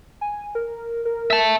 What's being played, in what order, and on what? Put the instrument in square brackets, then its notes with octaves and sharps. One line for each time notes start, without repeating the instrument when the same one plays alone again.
[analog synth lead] G#5
A#4
A#4
[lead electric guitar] E5 A5